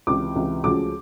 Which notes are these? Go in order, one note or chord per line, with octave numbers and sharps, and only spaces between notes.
C#2 C3 E3 D6
C#2 C3 E3
D2 C#3 F3 G#3 D6